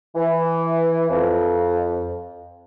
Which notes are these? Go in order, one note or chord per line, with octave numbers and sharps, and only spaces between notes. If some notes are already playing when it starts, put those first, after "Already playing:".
E3
F2